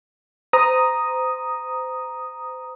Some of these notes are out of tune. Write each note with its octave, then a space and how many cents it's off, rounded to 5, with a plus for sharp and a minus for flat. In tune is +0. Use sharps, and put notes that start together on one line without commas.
C5 -30 A#5 +5 D#6 +0